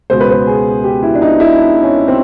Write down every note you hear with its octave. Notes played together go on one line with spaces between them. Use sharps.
C#2 B2 G#3 B3 C5
B4
C5
G#4
G4
E4
D4
D#4
E4
D4
C#4
C4